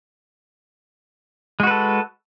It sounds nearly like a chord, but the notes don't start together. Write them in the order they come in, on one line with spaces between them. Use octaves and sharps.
G#3 F#4 B4 A4